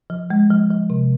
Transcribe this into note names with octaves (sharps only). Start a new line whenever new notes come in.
F3
G#3
F3
F3
C3